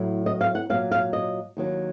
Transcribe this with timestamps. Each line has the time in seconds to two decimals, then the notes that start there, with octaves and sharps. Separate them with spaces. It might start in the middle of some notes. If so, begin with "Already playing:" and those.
Already playing: A2 F#3
0.26 D#5
0.41 F5
0.55 F#5
0.70 A#2 F#3 F5
0.91 F5
1.13 D#5
1.57 D#2 D#3 F#3